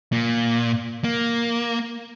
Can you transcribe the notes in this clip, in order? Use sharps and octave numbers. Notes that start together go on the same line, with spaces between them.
A#2
A#3